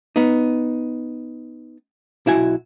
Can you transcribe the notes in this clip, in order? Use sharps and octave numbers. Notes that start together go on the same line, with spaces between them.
B3 D#4
B1 E4 F#4 G#5